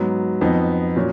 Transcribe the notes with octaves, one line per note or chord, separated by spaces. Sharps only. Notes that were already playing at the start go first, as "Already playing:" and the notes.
Already playing: G#2 F#3 B3
F2 F3 B3 D#4
A#2 F#3 C#4